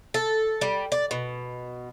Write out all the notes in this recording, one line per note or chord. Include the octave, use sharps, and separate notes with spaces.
A4
G3
D5
B2